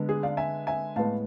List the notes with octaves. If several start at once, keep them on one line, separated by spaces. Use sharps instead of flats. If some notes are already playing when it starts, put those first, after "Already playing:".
Already playing: D3 G#3 B3
G#4
D5 F5
E5 G#5
E5 G#5
A2 G#3 B3 F5 A5